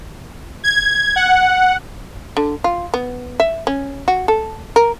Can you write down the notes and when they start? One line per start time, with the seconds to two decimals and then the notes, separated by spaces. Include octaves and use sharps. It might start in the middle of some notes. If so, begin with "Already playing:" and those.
0.64 G#6
1.16 F#5
2.37 D3
2.64 F4
2.94 B3
3.40 E5
3.67 C#4
4.08 F#4
4.28 A4
4.76 A#4